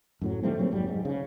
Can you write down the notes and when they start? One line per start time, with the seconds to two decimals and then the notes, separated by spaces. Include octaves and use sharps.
0.22 F#2 A2 F#3
0.43 D#3 G3 A3 C4
0.59 F#3 A#3 C4
0.71 F1 G#2 F#3 G3
0.89 G#2
1.05 C#3